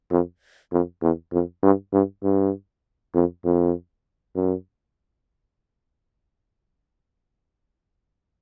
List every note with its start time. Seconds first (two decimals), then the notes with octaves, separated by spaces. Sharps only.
0.11 F2
0.72 F2
1.01 E2
1.33 F2
1.63 G2
1.93 G2
2.23 G2
3.15 F2
3.45 F2
4.35 F#2